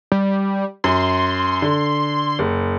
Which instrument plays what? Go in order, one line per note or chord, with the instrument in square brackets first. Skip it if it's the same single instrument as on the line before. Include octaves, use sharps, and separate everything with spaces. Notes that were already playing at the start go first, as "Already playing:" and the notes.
[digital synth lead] G3
[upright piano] F#2 [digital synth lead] C6
[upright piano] D3
F#1